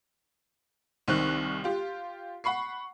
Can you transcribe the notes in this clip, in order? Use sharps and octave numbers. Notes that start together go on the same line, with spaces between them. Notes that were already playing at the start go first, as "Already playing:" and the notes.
C2 D#3 C4 C#6 F#6
F4 G4
F#5 B5 C#6 C7